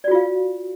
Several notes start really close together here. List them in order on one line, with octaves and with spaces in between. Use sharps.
D5 F#4 F4 F5